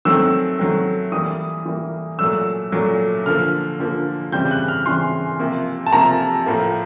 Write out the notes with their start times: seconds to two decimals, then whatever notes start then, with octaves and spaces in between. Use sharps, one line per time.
0.05 D#3 F#3 A3 C4 E6
0.59 D#3 F#3 A3 C4
1.12 E3 G3 A#3 D#6
1.66 E3 G3 A#3
2.19 A#2 F#3 A3 E6
2.72 A#2 F#3 A3
3.26 D3 F3 A#3 F6
3.79 D3 F3 A#3
4.32 C#3 E3 G3 C4 G6
4.51 F#6
4.68 F6
4.86 C#3 E3 G3 C4 C6
5.39 C3 F3 A#3
5.86 A5
5.93 C3 F3 A#3 A#5
6.46 A2 F3 A#3